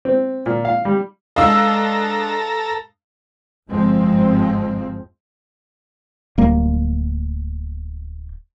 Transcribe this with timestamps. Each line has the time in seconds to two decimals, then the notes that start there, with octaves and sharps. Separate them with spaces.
0.05 C4
0.46 A#2
0.65 F5
0.85 G3
1.36 G#3 D4 A4 D#5 F5 A#5 E6
3.68 G1 F2 G#2 F3 G#3 C4
6.38 D1 G3 A#3